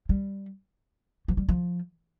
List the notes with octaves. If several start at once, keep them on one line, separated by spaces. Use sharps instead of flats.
G3
F3
G3
F3